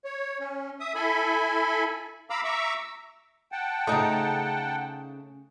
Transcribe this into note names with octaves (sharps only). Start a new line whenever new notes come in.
C#5
C#4
E5 D#6
E4 A4 E5 G#5 B5
F5 A#5 B5 D6 E6
E5 A#5 C#6 D6 E6
F#5 G5 A5
C#3 F3 A3 D#4